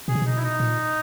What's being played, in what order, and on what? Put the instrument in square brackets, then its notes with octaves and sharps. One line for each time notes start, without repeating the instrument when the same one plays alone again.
[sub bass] B2 [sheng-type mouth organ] G#4
[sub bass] C#3
[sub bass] B2 [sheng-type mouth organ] D#4
[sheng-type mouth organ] E4
D#4
[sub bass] A#2